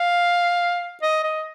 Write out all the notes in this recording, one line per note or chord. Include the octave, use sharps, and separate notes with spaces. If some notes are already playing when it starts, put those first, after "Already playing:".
Already playing: F5
D#5
D#5